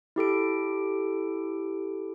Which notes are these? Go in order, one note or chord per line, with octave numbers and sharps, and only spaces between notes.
E4 G4 A4 D7